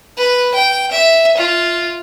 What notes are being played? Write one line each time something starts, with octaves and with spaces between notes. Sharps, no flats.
B4
G5
E5
F4